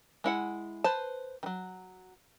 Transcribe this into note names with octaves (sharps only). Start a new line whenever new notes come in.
G#3 E4 F#5
B4 C5 A5
D#3 F#3